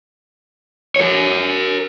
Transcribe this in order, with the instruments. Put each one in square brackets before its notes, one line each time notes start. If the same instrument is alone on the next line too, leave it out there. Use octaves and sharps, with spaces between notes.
[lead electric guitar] A#4 C#5